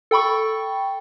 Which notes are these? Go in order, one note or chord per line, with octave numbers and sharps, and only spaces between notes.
A4 G5 B5 C#6